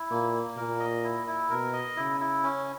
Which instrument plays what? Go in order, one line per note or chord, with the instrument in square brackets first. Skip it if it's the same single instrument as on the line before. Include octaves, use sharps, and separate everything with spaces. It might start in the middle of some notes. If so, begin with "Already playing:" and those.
Already playing: [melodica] E4
[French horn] A#2 [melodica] A#3
[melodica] A#3
[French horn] A#2 [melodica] A#4
[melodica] D#5
E4
E4
[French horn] B2 [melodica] A#4
[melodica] D#5
[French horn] C#3 [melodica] E4
[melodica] E4
C#4